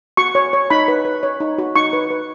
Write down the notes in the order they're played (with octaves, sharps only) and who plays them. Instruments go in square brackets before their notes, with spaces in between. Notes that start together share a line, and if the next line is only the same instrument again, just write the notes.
[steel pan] F#4 C#6
C#5
C#5
D#4 B5
B4
B4
C#5
D#4
F#4
D#4 C#6
B4
B4